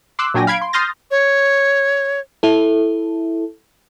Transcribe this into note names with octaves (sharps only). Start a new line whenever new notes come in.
C6 D6 E6 F#6
A#2 F#3 D4 G5 G#5 A#6
F5 B5 G#6 D7
C6
C6 D#6 F6 G6 A6 A#6
C#5
E4 A4